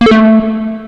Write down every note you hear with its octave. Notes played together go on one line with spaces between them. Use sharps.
A#3
A4
A3